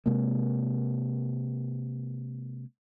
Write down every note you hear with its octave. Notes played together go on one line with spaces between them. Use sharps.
C3 G#3 A#3